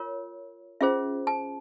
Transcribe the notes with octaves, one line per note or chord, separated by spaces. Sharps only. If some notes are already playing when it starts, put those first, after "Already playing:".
Already playing: F4 A#4 C#5
C#4 F4 G#4 C5 E5
A5